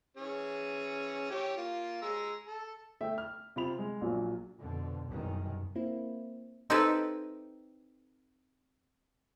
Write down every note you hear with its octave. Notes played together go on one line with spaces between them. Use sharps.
E3 C#4 G#4
E4 G4 C#5
A#3 F4
G#3 A#5 E6
A4
A3 E5 G5
F6
C3 F4 B5 F7
G#3
A#1 A#2 F#3
F2 B2 D3
F#1 C2 F#2 B2 D#3
A#3 C4 E4
C4 D#4 E4 G4 A4 B4